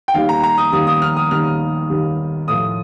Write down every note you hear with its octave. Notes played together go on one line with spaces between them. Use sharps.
G5
D#2 D#3 G3 F5
A#5
A#5
D#6
D#2 D#3 G3 D#6
D#6
F6
D#6
D#2 D#3 G3 F6
D#2 D#3 G3
A2 F3 D#6